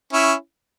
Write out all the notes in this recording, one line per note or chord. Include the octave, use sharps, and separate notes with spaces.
C#4 E4